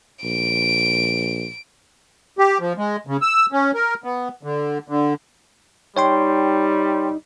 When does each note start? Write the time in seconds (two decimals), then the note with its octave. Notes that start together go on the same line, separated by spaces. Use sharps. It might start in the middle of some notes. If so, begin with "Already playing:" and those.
0.24 A#1 D7
2.38 G4
2.60 F3
2.77 G#3
3.07 C#3
3.22 E6
3.52 C#4
3.74 A#4
4.04 B3
4.43 D3
4.88 D3
5.97 G3 D#4 C#5 G5 C6